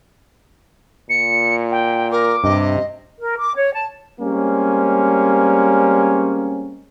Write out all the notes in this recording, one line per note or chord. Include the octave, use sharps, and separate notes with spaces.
A#2 C#7
G5
A#4 D6
G2 C3 D#5
A#4
D6
C#5
A5
G3 G#3 A#3 C4 C#4